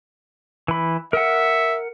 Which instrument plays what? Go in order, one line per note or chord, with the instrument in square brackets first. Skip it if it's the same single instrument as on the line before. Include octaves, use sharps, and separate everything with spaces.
[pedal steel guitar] E3 B5
[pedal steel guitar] A#4 F#5 [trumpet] E5